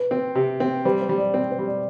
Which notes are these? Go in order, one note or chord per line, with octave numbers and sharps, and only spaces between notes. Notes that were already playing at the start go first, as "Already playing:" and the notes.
Already playing: B4
C4
C3
C4
G3 C5
C5
G3
D5
C4 C5
C5
G3
D5